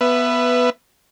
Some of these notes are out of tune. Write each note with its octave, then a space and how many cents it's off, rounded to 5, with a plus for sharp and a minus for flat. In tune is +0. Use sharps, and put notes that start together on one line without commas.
B3 +0 B4 +5 E5 +25